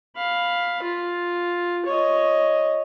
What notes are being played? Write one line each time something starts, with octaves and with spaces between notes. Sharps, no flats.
F5 B5
F4
C#5 D#5